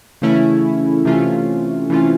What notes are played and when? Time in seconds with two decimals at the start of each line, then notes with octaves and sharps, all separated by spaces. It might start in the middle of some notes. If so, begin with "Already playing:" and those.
0.22 C#3 E3 A3 C#4 E4
1.05 C3 E3 A3 C#4 F4
1.90 C3 E3 A3 C#4 F4